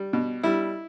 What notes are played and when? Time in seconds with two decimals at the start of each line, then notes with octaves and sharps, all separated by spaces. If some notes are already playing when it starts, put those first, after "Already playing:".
Already playing: G3
0.13 B2
0.43 G3 E4